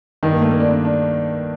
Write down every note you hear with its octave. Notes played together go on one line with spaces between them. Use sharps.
G2 D#3
A#3
A3
A#3
D4
D4
D4